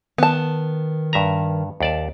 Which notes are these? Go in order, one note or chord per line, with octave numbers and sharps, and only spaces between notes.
D#3 B3 A5
G2 E5 A#5
D#2 D5 A5